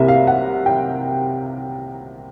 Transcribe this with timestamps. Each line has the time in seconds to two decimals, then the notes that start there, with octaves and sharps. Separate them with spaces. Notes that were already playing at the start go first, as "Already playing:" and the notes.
Already playing: C2 C3 A#3 E5
0.08 F5
0.27 F#5
0.66 G5